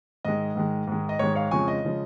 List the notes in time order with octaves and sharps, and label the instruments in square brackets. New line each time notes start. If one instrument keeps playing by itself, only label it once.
[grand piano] G#2 D#3 G#3 D#5
G#2 D#3 G#3
G#2 D#3 G#3
D#5
G#2 D#3 G#3 C#5
C#5 F5
F2 C#3 F3 G#3 G#5 C#6
D#5
C#3 F3 G#3